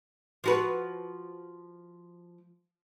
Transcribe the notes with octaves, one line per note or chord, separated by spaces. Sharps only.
F3 F#4 B4